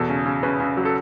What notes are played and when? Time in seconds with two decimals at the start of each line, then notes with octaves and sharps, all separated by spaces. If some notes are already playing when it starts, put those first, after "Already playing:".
Already playing: E2 B2 A4
0.09 C#3
0.26 C#3
0.43 C#3 B4
0.60 C#3
0.77 F#3
0.85 A4